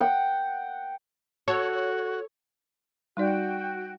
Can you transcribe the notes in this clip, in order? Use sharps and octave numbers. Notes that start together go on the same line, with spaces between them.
F#5 G5
F#4 A4 C#5
G3 D#4 F#4 D5 G5